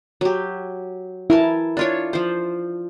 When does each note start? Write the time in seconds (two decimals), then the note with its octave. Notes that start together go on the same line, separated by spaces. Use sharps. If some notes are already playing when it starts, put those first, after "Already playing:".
0.21 F#3 G4
1.30 E4 A#4 G#5 A5
1.77 D4 F4 C#5
2.13 F3 C5